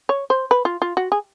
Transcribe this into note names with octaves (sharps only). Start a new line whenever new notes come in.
C#5
C5
B4
F4
F4
F#4
G#4